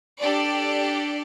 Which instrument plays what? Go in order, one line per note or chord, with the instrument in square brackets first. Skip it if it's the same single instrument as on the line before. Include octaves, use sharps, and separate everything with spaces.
[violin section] D4 G4 A4 D5